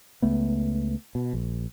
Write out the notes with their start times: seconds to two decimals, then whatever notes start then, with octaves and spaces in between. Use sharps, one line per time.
0.22 C#2 A3 B3
1.15 B2
1.33 A#1